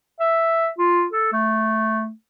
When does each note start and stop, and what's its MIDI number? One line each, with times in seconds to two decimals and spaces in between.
0.20 0.68 76
0.78 1.06 65
1.12 1.31 69
1.32 2.10 57